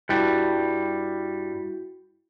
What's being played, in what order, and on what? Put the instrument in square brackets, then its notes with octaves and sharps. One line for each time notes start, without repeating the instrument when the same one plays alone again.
[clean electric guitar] G2 G3 [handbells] E4 F#4